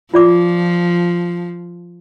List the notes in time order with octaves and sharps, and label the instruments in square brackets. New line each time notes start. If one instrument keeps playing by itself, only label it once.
[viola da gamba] F3 [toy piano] F4 D5 D6